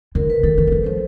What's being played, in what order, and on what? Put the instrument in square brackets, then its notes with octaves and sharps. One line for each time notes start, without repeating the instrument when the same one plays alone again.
[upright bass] D3 [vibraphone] A#4
[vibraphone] B4
[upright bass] D#3 [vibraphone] A4
[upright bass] D#3
F3
E3
[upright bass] F3 [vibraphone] C5